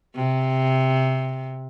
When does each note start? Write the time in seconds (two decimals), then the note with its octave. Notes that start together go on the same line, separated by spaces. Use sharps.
0.15 C3